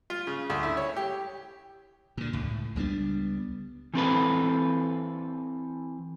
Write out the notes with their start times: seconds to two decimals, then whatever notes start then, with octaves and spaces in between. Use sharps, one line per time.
0.10 F4
0.27 C#3
0.50 D2
0.63 E4
0.77 C#5
0.96 G4
2.17 A#2 D3
2.33 C#2 A2
2.76 C#2 G3 B3 D4
3.94 E3 C4 A4 B4